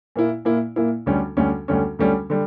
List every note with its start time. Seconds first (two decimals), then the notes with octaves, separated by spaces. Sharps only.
0.16 A#2 A#3 E4
0.45 A#2 A#3 E4
0.76 A#2 A#3 E4
1.06 D2 D3 G3 C#4
1.37 D2 D3 G3 C#4
1.68 D2 D3 G3 C#4
1.99 D2 D3 G3 C#4
2.30 D3 G3